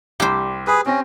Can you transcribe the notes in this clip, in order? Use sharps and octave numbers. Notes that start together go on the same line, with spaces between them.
C2 G3 G4 C5
G#4 B4 D#6
C4 C#4 G5 A#6